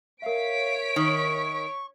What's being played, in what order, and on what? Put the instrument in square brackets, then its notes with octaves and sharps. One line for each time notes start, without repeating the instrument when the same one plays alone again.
[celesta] A#4 E5 [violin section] C#5 B6 D7 [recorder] F5
[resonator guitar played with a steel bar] D#3 [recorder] C#6